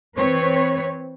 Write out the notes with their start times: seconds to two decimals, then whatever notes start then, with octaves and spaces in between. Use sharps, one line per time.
0.17 E3 C4 B4 C#5